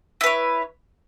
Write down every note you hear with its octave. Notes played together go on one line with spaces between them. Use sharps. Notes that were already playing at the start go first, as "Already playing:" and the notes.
E4 B4 C#5